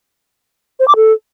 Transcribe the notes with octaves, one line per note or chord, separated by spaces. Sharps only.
C5
D6
A4